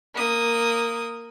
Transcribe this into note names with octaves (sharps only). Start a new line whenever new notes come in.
A#3 D#6